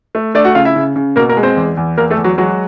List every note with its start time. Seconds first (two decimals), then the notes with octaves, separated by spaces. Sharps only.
0.15 A3
0.35 A3 D4 D5
0.44 F#4 F#5
0.55 C#3 F4 F5
0.65 E4 E5
0.76 C#3
0.96 C#3
1.16 B2 A#3 A#4
1.29 A#3 A#4
1.37 G#3
1.43 C4 C5
1.56 E2
1.77 E2
1.97 E2 A#3 A#4
2.10 A3 A4
2.17 E2
2.24 F#3 F#4
2.38 F#3 G#3 F#4